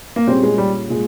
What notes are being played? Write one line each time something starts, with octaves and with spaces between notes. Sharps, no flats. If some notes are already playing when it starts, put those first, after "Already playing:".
A#3
A#2 G3 C4 C#4 G#4
G#3
G3
A#2 G#3